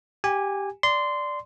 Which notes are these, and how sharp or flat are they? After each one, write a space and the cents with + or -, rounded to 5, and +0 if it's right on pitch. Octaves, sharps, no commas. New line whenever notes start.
G4 +0 G#5 -20
D5 +0 C6 -15